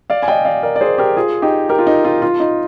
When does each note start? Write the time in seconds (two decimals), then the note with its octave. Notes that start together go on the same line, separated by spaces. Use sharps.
0.10 D5 F5
0.22 G#5
0.28 D#5 G5
0.45 D5 F5
0.63 A#4 D5
0.76 D5
0.81 G#4 C5
0.98 G4 A#4
1.16 F4 G#4
1.42 D#4 G4
1.69 G4 A#4
1.79 F4
1.87 D#4
2.05 F4
2.22 F4
2.40 D#4